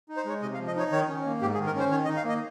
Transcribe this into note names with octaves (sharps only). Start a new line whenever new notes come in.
D#4
C5
G#3 C#5
C3 D#5
F5
F3
D#5
D#4 C#5
D#3 C#5
C#4
A#3
G#2 G4
G#4
D#3
A#4
C#4 C5
D#3 C#5
D#5
D#4
F5
A#3 D#5